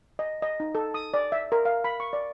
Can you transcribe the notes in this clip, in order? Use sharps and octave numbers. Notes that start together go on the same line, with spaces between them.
D#5
D#5
D#4
A4
D#6
D5
E5
A#4
F5
B5
C#6
D5